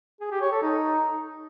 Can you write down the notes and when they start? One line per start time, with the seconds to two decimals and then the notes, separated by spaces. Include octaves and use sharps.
0.21 G#4
0.31 G4
0.42 C#5
0.52 A4
0.62 D#4